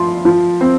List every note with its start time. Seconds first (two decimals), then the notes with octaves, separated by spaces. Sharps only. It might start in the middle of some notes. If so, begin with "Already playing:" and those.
Already playing: F3 C6
0.25 F3
0.61 C4